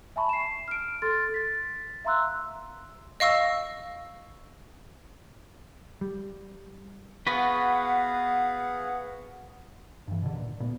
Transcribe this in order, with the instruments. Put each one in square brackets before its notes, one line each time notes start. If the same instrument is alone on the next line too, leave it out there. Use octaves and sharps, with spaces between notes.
[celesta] E5 G#5 A5 B5 C#6
C7 E7
F6 D7
A4 C6 F6 A6
A6 B6
E5 F5 A#5 C6 E6 F#6
[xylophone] D#5 F5 C#6 E6
[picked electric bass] G3
[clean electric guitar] B3 F#4 B4 [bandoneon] G#4 F5 F#5
[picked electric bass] G2 E3
B2 D3
D1 A#2
G#1 A#2 B3